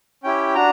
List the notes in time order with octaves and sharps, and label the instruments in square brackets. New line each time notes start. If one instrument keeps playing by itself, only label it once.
[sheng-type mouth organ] C#4 E4 G4 G5
D4 F#4 A#5